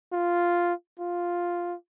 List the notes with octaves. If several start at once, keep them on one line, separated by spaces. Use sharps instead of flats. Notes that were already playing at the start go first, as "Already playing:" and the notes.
F4
F4